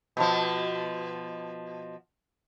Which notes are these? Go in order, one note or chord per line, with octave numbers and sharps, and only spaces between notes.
B2 F3